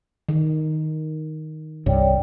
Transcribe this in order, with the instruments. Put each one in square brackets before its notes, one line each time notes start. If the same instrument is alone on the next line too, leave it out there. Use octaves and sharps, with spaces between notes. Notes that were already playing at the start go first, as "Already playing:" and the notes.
[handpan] D#3
[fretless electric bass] C2 G2 [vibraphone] C#5 D5 G5